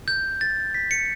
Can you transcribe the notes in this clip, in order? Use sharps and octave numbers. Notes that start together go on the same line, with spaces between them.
G6
A6
B6
C#7